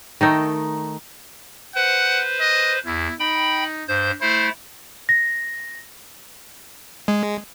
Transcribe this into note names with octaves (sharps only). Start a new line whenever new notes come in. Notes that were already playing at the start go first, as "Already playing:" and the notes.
D#3 A3 D#4
B4 C5 F#5
D#5
E2 E4
D#4 G5 B5
G2 C5 G6
A3 E4 C5
A#6
G#3